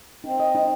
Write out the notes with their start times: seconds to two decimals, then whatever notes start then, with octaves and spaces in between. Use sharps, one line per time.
0.24 C4 D#4
0.40 D#5
0.55 D#4